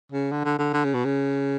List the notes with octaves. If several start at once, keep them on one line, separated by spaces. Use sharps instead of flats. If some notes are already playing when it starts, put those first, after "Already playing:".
C#3
D3
D3
D3
D3
C#3
B2
C#3